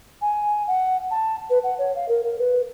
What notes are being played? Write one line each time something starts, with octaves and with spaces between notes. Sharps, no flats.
G#5
F#5
A5
B4
F#5
C#5
F5
A#4
A#4
B4